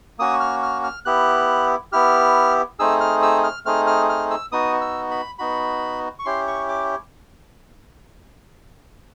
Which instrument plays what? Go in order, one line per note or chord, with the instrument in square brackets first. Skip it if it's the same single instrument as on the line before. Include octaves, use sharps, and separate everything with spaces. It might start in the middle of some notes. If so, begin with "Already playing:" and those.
[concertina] A#3 C#4 F#4 D#6
F6
F6
F6
B3 E4 G4 F#6
B3 E4 G4 F6
A3 C4 D#4 G#4 E6
F6
E6
F6
A3 C4 D#4 G#4 F6
F6
F6
E6
B3 D#4 F#4 D#6
E6
B5
B3 D#4 F#4 B5
C#6
C#4 E4 G4 C6
C#6
D6